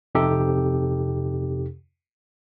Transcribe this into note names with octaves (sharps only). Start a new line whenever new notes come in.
F2 C3 D#4 G4 A4